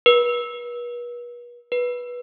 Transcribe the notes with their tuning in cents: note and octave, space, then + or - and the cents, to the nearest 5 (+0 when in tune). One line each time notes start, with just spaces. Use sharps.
B4 -40
B4 -15